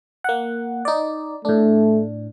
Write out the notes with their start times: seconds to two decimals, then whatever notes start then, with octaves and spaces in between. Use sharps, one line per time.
0.24 A#3 F#5
0.85 D#4 D5
1.45 A2 A3 D4